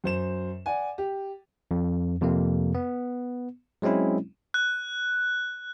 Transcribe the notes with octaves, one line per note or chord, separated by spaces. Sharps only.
F#2 C5 E7
D5 F#5 G#5
G4
F2
F2 C3 A#3
B3
F#3 G#3 C4 C#4 E4
F#6